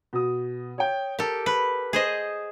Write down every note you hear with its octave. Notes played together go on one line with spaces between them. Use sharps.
B2 D#6
C#5 G5
G4 A4 A#4
B4
G#4 C5 D#5